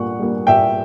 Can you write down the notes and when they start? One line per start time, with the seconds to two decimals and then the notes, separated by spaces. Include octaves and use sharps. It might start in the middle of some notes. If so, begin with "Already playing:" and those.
Already playing: A#2 G3 A#3 F#5 C#6
0.20 G3 A#3
0.47 A#2 E5 G5